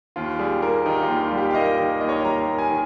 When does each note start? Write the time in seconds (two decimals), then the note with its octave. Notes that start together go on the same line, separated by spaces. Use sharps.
0.16 D#2 F4
0.39 G3 G#4
0.62 A#3 A#4
0.86 D#3 D#4
0.97 G4
1.03 F4
1.08 D#2
1.21 F4
1.32 G3
1.38 G4
1.51 F5
1.55 A#3 D#5
1.78 D#3
2.01 D#2 D#5
2.09 C#5
2.16 D#5
2.24 G3 A#5
2.47 A#3
2.58 G#5
2.70 D#3